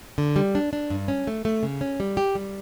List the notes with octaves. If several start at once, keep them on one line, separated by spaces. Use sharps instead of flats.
D3
G3
D4
D4
G2
C#4
A3
A3
C#3
C#4
G3
G4
G3